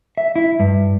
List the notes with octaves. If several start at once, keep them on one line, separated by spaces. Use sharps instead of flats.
E5
E4
G2